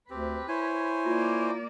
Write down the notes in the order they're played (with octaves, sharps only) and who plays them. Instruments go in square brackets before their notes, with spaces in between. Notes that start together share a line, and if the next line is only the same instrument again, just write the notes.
[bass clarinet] D2 [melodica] C4 G4 [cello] B4
[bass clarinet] E4 [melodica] C5 C#5 G#5
[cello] A#3 D5 [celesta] F4